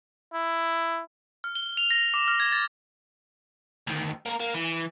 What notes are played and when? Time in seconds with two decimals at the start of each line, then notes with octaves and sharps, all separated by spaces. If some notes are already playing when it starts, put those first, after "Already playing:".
0.34 E4
1.44 F6
1.55 G7
1.77 F7
1.91 A#6
2.14 D6
2.28 F6
2.40 G#6
2.52 A6
3.87 D2 D#3
4.26 A#3 A#4
4.40 A#3
4.54 E3